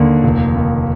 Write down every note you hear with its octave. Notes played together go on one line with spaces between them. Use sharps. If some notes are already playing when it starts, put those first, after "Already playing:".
Already playing: D#2 D3
F1
D#2